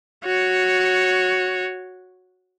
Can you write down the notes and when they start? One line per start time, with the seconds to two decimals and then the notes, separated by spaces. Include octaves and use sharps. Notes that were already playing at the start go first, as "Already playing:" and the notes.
0.25 F#4 C#5